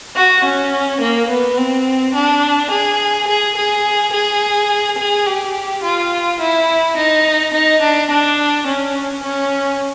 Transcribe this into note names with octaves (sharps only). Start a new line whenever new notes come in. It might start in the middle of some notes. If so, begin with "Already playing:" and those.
F#4
C#4
A#3
B3
C4
D4
G#4
G#4
G#4
G#4
G#4
G4
F4
E4
D#4
D#4
D4
D4
C#4
C#4